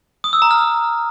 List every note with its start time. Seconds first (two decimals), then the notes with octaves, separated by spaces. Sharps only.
0.24 D#6
0.33 E6
0.42 A#5
0.51 F6